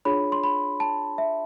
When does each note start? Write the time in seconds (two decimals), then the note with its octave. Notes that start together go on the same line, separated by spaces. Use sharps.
0.05 D4 F4 G#4 C#5 B5
0.32 C6
0.44 B5
0.80 A5
1.18 E5